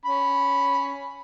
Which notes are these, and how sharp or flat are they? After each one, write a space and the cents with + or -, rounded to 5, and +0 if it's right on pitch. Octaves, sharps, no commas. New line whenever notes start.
C#4 +5 B5 +0